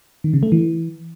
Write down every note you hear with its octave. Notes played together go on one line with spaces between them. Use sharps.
D#3
C#3
A3
E3